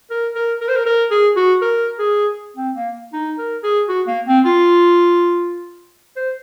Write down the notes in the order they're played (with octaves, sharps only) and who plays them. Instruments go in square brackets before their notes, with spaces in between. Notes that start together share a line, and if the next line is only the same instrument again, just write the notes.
[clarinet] A#4
A#4
A#4
C5
A#4
A#4
G#4
F#4
A#4
G#4
C4
A#3
D#4
A#4
G#4
F#4
A#3
C4
F4
C5